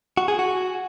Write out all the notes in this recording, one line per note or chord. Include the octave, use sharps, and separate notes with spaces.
F#4
G#4
F#4